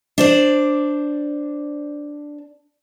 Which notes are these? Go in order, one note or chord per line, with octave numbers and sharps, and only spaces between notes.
D4 C5 D5